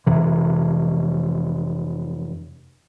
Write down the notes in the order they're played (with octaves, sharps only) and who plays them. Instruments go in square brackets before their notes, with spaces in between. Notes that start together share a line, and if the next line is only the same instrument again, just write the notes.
[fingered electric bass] F2 C3 E3